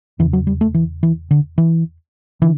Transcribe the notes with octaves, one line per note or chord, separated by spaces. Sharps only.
E2 C#3 E3
F#3
G3
A3
E3
E3
D3
E3
D3 E3